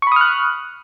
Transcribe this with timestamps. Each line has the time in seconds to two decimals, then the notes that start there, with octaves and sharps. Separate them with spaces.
0.02 C#6
0.07 B5
0.12 D#6
0.16 F6
0.21 F#6